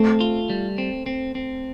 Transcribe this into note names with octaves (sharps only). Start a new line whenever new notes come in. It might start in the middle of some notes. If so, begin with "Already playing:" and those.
Already playing: A3 C4
F4
G3
C4
C4
C4